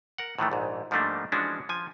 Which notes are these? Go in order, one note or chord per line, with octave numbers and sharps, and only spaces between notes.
A#4 F#5
A2 D#3 E3 A3
A#1 G#2
G#2 F3 G3 A3 A#3 D4
E3 F3 G#3 C#4 D4 F#4
F3 G#5